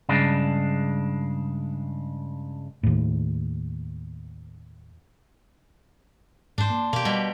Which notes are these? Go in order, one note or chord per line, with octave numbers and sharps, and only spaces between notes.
G2 C#3 G#3 D4
D#2 A2
G#2 D4 C5
A#3
B2 A#3 G4
B2 G3 G5